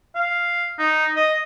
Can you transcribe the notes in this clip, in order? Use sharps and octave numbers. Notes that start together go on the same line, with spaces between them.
F5
D#4
D#5